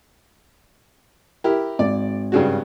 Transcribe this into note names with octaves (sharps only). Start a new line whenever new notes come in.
E4 G4 A#4
G#1 D5
G2 C#3 F#4